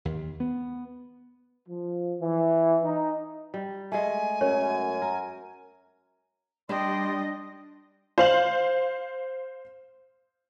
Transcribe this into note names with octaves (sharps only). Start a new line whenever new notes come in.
D#2
B3
F3
E3
D#4
G3
G#3 A3 G#5
F#2 C#4 C#5
A#4
G3 D4 D5 D#5 G5 C6
C5 F5 F#7